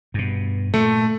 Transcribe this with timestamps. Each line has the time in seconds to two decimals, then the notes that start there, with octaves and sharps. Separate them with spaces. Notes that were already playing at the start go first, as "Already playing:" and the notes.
0.14 G2 B2
0.74 A#2 A3